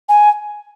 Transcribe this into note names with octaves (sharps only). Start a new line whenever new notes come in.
G#5